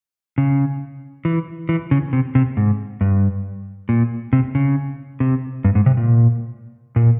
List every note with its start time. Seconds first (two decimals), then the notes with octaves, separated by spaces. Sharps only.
0.38 C#3
1.25 E3
1.69 E3
1.91 C#3
2.13 C3
2.35 C3
2.57 G#2
3.01 G2
3.89 A#2
4.33 C3
4.55 C#3
5.20 C3
5.65 G2
5.75 G#2
5.86 C3
5.97 A#2
6.96 A#2